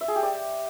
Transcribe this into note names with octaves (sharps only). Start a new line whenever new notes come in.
E5
G#4
G4
D5